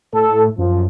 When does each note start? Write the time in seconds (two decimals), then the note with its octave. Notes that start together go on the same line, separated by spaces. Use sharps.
0.13 A2 A4
0.58 F#2 F3